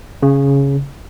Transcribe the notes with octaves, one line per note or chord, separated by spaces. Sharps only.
C#3